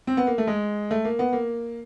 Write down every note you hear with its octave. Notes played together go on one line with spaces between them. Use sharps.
C4
B3
A#3
A3
G#3
A3
A#3
B3
A#3